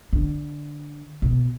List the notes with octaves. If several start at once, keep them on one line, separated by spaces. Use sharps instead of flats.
D3
B2